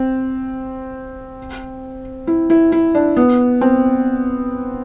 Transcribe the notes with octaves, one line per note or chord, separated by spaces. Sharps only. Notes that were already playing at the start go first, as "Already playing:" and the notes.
Already playing: C4
E4
E4
E4
D4
B3
C4